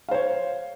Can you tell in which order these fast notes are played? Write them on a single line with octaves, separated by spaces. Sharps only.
F5 C5 C#5